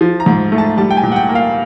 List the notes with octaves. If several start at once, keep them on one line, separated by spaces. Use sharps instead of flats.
F3
A#5
G#2
A3
A5
G3 A5
G5
G#5
A#2
F#5
G5
A#3
F5